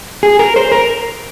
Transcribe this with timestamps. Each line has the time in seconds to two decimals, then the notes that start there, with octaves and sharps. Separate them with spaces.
0.23 G#4
0.39 A#4
0.56 C5
0.72 A#4